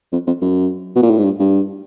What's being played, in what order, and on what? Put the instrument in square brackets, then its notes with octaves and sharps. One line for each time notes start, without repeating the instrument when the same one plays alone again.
[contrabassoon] F2
F2
F#2
B2
A#2
A2
G#2
G2
G2